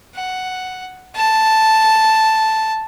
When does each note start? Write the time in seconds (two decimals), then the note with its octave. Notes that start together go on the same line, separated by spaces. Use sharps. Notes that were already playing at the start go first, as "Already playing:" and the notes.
0.15 F#5
1.16 A5